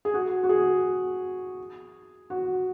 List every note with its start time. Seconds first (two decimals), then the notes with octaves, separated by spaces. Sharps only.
0.05 G#4
0.14 F#4
0.43 F#4
0.49 G#4
2.30 F#4